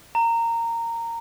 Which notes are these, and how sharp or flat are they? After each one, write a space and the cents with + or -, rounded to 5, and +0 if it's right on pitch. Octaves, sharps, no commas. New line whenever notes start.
A#5 -15